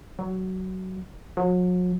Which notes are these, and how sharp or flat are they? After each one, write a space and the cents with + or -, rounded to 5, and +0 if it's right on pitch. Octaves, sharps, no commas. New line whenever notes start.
F#3 +15
F#3 -40